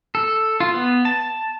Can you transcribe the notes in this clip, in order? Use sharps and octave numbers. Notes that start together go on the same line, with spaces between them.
A4
F4
B3
A5